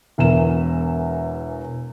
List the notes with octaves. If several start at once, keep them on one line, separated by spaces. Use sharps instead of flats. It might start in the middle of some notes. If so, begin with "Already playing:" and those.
E1 E2 E4 A#4 E7